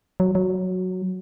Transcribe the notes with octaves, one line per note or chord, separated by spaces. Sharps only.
F#3
F#3